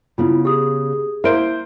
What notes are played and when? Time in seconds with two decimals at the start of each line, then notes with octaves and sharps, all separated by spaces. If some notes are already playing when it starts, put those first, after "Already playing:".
0.18 C#3 B3 E4 F4
0.45 G4 G#4 D#6
1.24 A#3 E4 C5 E5 D7